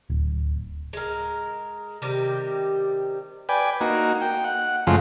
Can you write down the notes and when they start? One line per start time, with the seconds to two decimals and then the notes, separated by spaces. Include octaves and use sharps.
0.10 D1
0.93 G#3 A#4
2.02 C3 D#3 G3 G4
3.49 B4 D5 G5 G#5
3.81 A#3 D#4 F#4
4.22 G5
4.44 F#5
4.87 F#2 C#3 F3 G#3 A3 F4